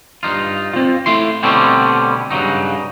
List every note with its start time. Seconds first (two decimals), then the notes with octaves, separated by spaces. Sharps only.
0.23 G2 D#4 F4
0.73 C4 F4
1.06 A3 E4 C6
1.43 B2 D3 G3 A3 C4 C#4
2.30 G2 C#3 F#3 D#4